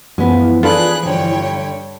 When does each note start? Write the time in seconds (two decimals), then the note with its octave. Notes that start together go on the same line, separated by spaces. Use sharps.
0.18 F#2 E3 F3 G#3 B3
0.63 D4 F4 G#4 A4 B4 F5 B5 F#6
1.06 G2 D3 C#5 G5